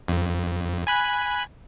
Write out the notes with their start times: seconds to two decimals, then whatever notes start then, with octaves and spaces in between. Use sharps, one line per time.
0.08 F2
0.87 G#5 B5 F#6